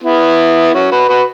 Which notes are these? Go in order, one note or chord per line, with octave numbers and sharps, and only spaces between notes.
B3 E4
C#4 F#4
F#4 B4
F#4 B4